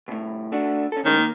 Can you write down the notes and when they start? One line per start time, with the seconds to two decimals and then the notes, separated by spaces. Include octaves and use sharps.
0.08 C2 A2
0.52 A3 D4 F#4
0.92 C#4 A4
1.05 A2 D#3 G#3 C#4
1.17 A#3